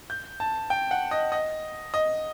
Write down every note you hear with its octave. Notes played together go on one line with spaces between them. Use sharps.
G6
A5
G5
F#5
D#5
D#5
D#5